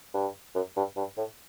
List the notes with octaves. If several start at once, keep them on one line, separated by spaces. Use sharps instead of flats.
G2
F#2
G2
G2
A2